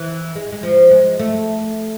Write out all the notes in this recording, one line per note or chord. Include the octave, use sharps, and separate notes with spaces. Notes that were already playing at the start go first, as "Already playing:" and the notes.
Already playing: E3
G#3
G#3
F3
G#3
A3